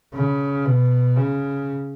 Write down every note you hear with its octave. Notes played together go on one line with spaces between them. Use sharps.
C#3
B2
C#3